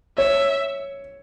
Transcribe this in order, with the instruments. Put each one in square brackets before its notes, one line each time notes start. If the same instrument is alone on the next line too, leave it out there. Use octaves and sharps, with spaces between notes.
[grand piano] C#5 [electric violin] E5